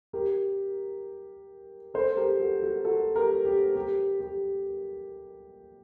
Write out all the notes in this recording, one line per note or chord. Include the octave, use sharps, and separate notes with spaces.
G4 A#4
A4 C5
G4 A#4
F#4 A4
F#4 A4
F#4 A4
G4 A#4
G4
G4
G4